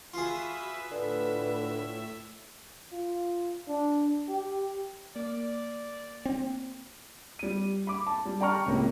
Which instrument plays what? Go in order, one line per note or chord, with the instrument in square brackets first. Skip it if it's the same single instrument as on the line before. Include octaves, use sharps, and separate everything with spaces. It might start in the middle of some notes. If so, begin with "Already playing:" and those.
[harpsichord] F4 G#4 [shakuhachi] F#4 [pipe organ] B4 E5
[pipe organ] A2 E5 [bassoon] D3 [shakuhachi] B4
[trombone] F4
D4
G4
[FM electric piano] A#3 [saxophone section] D5
[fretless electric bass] C4
[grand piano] G3 D#7
B5 D6
A5
G3
D5 G5 A5 A#5 C#6 F6
C#2 A2 C3 A#3